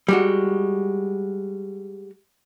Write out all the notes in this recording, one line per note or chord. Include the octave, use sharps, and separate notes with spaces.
G3 G#3 F#4